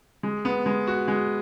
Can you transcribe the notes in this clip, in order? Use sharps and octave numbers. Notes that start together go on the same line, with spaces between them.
G#3
B3
G#3
F#4
G#3